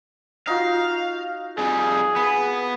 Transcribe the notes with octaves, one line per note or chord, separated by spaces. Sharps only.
D#4 F4 F#4 F5
F2 G3 G#4
B3 B5